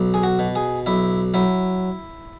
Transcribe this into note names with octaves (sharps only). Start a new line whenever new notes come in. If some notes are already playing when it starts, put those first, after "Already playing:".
Already playing: B1
G#4
F#4
B2
G#4
B1 E4
F#3 E4